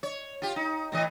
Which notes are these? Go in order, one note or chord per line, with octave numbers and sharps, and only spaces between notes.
C#5
F4 G4
D#4
A2 E3 D#5